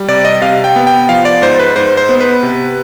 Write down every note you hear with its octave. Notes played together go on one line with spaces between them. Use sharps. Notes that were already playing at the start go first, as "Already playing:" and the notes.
Already playing: G3
C3 D5
D#5
C3 F5
G5
B3
G5
F3 F5
D5
G#2 C5
B4
G#2 C5
C5
B3
B4
C3